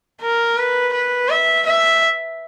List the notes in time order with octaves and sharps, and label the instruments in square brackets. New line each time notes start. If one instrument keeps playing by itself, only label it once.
[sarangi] A#4
B4
B4
E5
E5